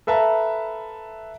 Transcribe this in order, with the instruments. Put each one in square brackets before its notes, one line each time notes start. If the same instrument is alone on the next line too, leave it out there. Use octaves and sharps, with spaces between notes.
[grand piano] A4 B4 E5 F5 A5 A#5